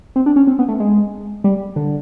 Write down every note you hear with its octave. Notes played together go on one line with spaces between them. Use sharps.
C4
D4
C#4
C4
B3
A3
G#3
G3
D3